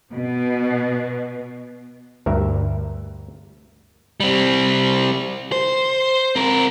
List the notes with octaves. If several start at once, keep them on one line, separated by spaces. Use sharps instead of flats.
B2
D2 G2 A#4 E5
G3 C4
C5
C4 A#4